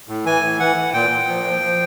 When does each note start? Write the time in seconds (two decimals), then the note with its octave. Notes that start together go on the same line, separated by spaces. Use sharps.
0.09 A2
0.26 E3 G#5
0.43 A2
0.59 E3 F#5
0.76 E3
0.93 A#2 G5
1.10 A#2
1.28 F3
1.44 F3
1.61 F3